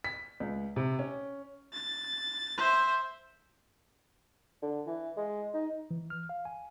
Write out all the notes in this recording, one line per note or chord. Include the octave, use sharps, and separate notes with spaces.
B6
C#2
C3
C#4
A6
C5 E5
D3
E3
G#3
D#4
E3
F6
F5
G#5